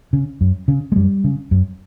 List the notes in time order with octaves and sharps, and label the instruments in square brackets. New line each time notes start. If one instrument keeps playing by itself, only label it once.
[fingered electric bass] C#3
F#2
C#3
G#3
F#2 G3
C#3
F#2